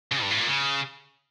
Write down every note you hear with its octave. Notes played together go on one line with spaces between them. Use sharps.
C#3
G2
A2
A#2
C#3